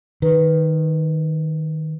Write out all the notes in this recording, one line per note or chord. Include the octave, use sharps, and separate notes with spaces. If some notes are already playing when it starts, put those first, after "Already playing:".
D#3 B4